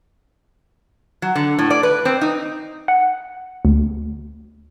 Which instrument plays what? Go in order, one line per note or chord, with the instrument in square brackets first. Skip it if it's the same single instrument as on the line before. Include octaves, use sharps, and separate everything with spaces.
[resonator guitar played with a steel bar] F#3
D3
A2
D5
B4
C4
D#4
[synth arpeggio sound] F#5
D2